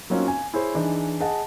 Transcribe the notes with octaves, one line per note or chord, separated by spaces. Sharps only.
F#3 A#3 C4 C#4 D#4 F4
G#5
E4 G#4 C5 C#5
E3 D4 D#4 G#4
G#4 D#5 F#5 A5